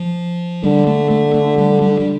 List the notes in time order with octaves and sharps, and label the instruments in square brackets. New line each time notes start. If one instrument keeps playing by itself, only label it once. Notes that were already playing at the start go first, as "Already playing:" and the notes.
Already playing: [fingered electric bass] F3
[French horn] D3 [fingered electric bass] G3
[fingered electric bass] A3
A3
A3
G3
G3
G3